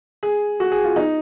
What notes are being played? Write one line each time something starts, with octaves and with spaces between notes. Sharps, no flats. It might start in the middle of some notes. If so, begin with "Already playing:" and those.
G#4
F#4
G#4
F4
D#4